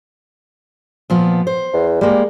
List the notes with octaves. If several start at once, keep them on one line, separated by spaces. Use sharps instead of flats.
A#2 F3 B3
C5
E2
G3 G#3 A#3